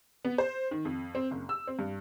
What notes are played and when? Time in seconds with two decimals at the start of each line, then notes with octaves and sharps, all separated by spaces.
0.25 B3
0.38 C5
0.71 D#3
0.85 F2
1.15 C4
1.31 F#1
1.49 E6
1.68 C4
1.79 G2